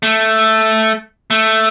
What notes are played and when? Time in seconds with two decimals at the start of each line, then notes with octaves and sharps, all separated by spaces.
0.03 A3
1.31 A3